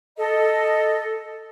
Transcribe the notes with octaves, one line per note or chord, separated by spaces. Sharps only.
A4 D#5